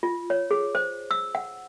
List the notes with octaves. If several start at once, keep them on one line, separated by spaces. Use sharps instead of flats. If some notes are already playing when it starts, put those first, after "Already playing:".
F4
C#5
G#4
C5
E6
F#5